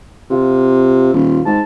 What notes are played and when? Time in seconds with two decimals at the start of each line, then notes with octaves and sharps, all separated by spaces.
0.30 C3 F4
1.13 D#1
1.45 G#2 A5